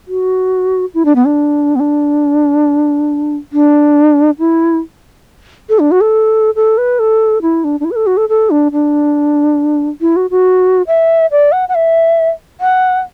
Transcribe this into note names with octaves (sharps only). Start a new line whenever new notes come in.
F#4
E4
D4
B3
D4
B3
D4
D4
E4
A4
D4
F#4
A4
A4
B4
A4
E4
D4
D4
E4
B4
A4
F#4
A4
A4
D4
D4
E4
F#4
F#4
E5
D5
F#5
F#5
E5
F#5